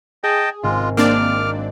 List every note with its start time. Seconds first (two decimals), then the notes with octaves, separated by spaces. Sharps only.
0.24 G#4 D#5 G5 A5
0.63 G#1 G#3 F4
0.97 A#3 C4 D4 D5 D6 F6